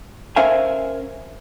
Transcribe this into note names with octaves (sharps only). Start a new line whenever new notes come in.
C#4 A#4 C5 E5 F5 G#5